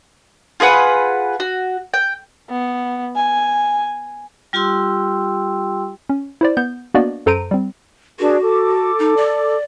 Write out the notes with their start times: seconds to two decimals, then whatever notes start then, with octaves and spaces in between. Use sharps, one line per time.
0.60 F4 G#4 B4 F#5
1.40 F#4
1.94 G5
2.50 B3
3.16 G#5
4.53 G3 F4 G4 G5 C6 E6
6.09 C#4
6.41 E4 C5 D5
6.57 B3 G6
6.94 A#3 B3 D4 F#4 D5 D#5
7.26 F#2 A4 C5 A#5 D7 D#7
7.51 G3 C4
8.19 D4 F#4 G#4 A#4
8.42 A4 D6
8.99 D#4
9.17 D5